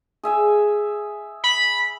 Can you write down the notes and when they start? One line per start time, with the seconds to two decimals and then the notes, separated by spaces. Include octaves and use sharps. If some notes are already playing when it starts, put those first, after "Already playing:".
0.24 G#4 E5 G#5
1.44 B5